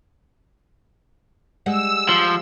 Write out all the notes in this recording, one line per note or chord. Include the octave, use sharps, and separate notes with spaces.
G3 G#3 F#5 E6
F3